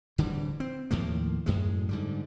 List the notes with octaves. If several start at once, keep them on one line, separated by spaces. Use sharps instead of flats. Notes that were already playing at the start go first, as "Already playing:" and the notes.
D1 D3 E3 G3
C4
D#2 A2 F3 A#3
F#2 A2 G#3
G#2 D3 G3